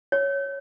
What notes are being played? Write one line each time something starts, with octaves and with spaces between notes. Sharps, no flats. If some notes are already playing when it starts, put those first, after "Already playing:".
C#5